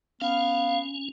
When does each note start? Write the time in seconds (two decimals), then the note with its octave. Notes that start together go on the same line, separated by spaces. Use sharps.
0.21 B3 C#4 F5